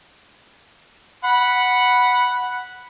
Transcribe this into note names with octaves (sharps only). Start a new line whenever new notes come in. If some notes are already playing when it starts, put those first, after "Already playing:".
F#5 B5